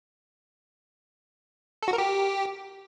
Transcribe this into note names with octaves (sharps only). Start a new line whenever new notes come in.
A4
F#4
A#4
G4